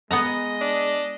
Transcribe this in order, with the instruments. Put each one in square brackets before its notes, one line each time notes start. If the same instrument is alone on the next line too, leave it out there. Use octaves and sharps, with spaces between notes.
[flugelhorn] G#3 [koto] B3 F#5 A#5 [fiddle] D#5
[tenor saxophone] D4